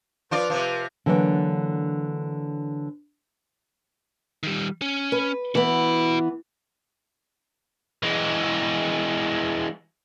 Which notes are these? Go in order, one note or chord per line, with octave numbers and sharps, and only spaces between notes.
F3 F4 B4 D5
C3 F3
D3 E3 F#3 G3 A#3 D4
D#3 G3
C#4
B4
E3 B3 F#4 B5
E3 G#3